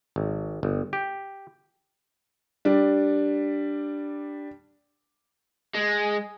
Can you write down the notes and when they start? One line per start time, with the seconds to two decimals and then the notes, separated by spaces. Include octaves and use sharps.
0.16 G#1
0.63 G1
0.93 G4
2.65 G3 D4
5.74 G#3